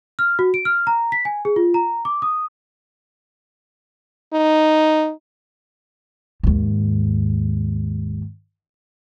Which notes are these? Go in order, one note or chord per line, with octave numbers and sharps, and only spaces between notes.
F6
F#4
D7
F6
A#5
B6
G#5
G#4
F4
A#5
D6
D#6
D#4
D#2 G#2